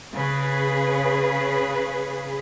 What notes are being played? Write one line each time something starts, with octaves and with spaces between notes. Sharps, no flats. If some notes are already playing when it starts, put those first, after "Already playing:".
C#3 G#4 B4